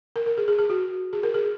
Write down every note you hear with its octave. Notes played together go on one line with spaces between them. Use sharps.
A#4
A#4
G#4
G#4
G#4
F#4
G#4
A#4
G#4